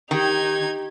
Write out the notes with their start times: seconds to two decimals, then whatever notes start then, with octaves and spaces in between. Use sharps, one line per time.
0.11 D#3 D#4 G4 G#6